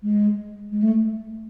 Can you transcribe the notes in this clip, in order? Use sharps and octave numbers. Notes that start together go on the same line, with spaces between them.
G#3
G#3
A3